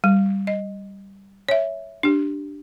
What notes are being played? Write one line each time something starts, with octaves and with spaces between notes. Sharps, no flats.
G3
D#5
C#5 E5
D4 G4